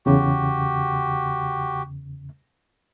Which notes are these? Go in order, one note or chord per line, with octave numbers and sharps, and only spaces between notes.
E2 C#3 F#4 G4